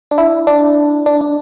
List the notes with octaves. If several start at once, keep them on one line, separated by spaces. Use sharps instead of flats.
D4
E4
D4
D4
D4